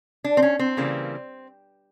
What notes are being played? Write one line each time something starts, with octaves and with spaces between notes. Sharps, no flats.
D4
C4
C#4
C4
C#3 E3 G3 A#3